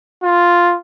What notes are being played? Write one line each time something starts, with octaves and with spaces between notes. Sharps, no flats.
F4